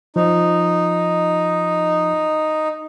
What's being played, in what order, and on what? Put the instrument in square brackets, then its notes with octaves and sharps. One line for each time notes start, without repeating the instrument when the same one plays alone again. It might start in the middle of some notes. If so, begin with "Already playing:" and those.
[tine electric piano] F3 [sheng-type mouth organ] D#4